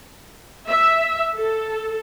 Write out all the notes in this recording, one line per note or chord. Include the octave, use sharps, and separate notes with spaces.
E5
A4